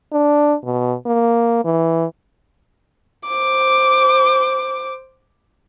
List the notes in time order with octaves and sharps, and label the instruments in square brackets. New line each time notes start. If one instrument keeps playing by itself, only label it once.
[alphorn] D4
B2
A#3
E3
[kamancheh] C5 D6